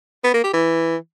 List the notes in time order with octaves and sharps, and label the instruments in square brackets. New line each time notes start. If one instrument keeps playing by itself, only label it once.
[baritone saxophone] B3
A#3
G4
E3